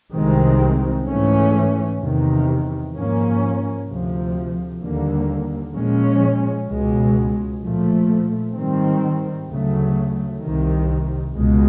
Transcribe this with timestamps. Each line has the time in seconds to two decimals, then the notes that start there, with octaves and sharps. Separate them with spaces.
0.13 C2 C3 D#3 G#3 C4
1.08 G#2 E3 A3 C#4
2.00 E2 C3 D#3
2.95 G#2 F3 A#3 C#4
3.88 D2 C3 F3
4.81 D#2 D3 G3 A#3
5.74 A#2 F3 G#3 C#4
6.68 C#2 B2 G#3
7.61 A#2 F3 A3
8.54 G#2 D#3 G3 C4
9.48 D2 C#3 F#3 A3
10.41 C2 C3 D#3
11.35 C#2 B2 G#3